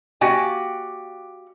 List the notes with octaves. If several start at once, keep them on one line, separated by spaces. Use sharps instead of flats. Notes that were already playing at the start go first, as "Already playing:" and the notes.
A#3 F#4 G4 D5 G#5